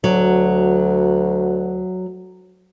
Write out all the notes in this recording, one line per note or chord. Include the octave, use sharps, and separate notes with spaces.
D2 F#3